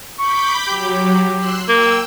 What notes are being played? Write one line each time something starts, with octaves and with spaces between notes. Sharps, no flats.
B5 C#6 D6 G6
F#3 G4
C6 E6 F#6
A#3 G5 E6